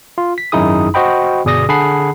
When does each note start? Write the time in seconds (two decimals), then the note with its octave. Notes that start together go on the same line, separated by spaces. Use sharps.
0.18 F4
0.38 B6
0.52 G#1 F#2 D#4 E4 G#4 D#6
0.94 F#4 C5 D#5 G5 B5
1.45 G1 B2 G#4 D5 D#6 A#6
1.69 D3 G#4 F#5 A5 B5 C7